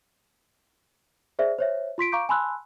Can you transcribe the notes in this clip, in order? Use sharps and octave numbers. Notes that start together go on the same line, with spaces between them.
G#4 C5 D5 E5
C5 C#5 E5
F4 C6 B6 D7
F5 A#5 C#6 D6 G6 D7
G#5 A5 B5 C6 E6 F#6